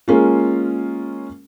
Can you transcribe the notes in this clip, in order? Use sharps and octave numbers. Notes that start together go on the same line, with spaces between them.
G#3 A#3 C#4 F4